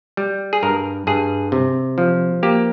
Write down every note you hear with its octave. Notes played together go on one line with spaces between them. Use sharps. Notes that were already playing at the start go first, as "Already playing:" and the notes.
G3
G#4
G2 A#4
G2 G#4
C3
F3
A#3 G4